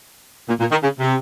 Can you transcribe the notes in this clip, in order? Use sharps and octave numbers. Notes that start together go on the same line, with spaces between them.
A#2
A#2
D#3
C#3
C3